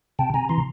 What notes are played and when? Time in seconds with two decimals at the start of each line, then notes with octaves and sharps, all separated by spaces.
0.19 C3 G5 A5
0.34 C3 G#5 A#5
0.49 E3 A#5 C6